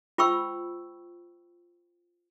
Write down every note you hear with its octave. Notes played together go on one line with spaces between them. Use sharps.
F4 C5 G5 B5 C#6 E6